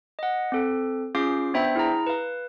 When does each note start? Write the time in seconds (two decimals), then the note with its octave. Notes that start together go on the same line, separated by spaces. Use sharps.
0.19 D#5 F#5
0.52 C4 A4
1.15 C#4 F4 G#4 F5 D6 C7
1.54 B3 D4 C5 E5 G5 B5
1.76 E4 G#4 A#5
2.07 B4 F5